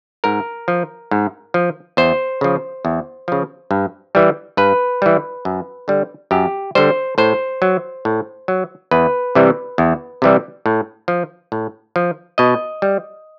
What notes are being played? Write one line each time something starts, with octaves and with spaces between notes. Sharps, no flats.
G#2 A#4
F3
G#2
F3
E2 C5
C#3 F3
E2
C#3 F3
G2
E3 G3
G2 B4
E3 G3
F#2
D3 G3
F#2 G4
D3 G3 C5
A2 C5
F#3
A2
F#3
E2 B4
C3 E3 G3
E2
C3 E3 G3
A2
F3
A2
F3
B2 D#5
G3